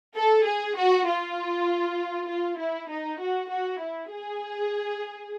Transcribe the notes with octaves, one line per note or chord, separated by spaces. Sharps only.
A4
G#4
F#4
F4
F4
E4
D#4
F#4
F#4
E4
G#4